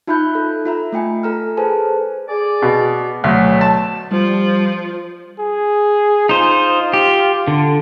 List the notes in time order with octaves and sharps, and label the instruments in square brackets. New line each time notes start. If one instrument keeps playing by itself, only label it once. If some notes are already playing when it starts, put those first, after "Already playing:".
[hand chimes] D#4 F4 E5 B5 F#6 G6
A4
F4 E5 A#5
A3 F4 G5 G#5
A4 A#5 F6
G#4 A4 B4 C5 G#5 A5
[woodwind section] G#4 D5
[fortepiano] B2
[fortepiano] D2 [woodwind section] B2 F#3 A3
[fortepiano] A5
[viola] F3 [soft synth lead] G3
[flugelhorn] G#4
[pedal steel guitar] D#4 C5 [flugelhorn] F4
[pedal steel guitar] G4
D3